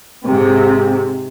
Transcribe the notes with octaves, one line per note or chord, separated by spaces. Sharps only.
G#2 C3